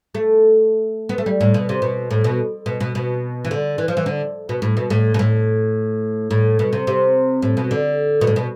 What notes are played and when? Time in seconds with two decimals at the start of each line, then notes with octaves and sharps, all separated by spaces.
0.15 A3
1.09 B3
1.18 A3
1.26 G3
1.41 A2
1.54 B2
1.69 C3
1.82 B2
2.11 A2
2.24 B2
2.66 B2
2.80 B2
2.95 B2
3.45 E3
3.51 D3
3.78 E3
3.88 F3
3.97 E3
4.06 D3
4.49 B2
4.62 A2
4.77 B2
4.90 A2
5.14 B2
5.19 A2
6.31 A2
6.59 B2
6.73 C3
6.87 C3
7.42 A2
7.57 B2
7.71 D3
8.21 B2
8.27 A2
8.36 B2